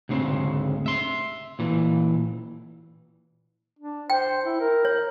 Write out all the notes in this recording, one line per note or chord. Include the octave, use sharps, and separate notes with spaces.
D2 G#2 C#3 C4
E5 C6
A#2 E3
D4
C5 G5
E4
A#4
C#5